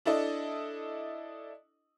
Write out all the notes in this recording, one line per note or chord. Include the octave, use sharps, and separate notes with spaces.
D4 E4 A4 D#5